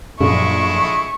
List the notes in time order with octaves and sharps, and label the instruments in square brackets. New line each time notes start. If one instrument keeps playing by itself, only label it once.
[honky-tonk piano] A#1 [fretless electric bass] F#2 [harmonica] G#3 A3 E4 [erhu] C#6